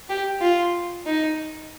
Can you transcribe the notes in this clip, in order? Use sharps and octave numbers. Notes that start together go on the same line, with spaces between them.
G4
F4
D#4